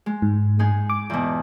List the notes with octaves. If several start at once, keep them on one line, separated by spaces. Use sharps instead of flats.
G#3
G#2
G#3 D#4 G#4
D6
E2 B2